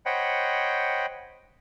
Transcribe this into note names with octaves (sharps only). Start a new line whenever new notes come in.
C5 C#5 D#5 F#5 G5 B5